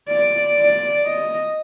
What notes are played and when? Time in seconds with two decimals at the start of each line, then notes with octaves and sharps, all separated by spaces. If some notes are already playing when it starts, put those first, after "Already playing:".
0.09 D5
0.57 D5
1.06 D#5